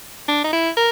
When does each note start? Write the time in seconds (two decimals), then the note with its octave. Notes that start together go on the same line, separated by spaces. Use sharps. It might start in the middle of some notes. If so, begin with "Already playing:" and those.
0.28 D4
0.44 D#4
0.53 E4
0.77 A#4